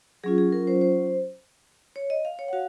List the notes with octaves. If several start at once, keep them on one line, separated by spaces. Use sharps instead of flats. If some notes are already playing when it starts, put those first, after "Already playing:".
F#3 C#4 F4 G#4
G#4
A#4
C5
C5
C#5
D#5
F5
C#5
F#5
F#4 F5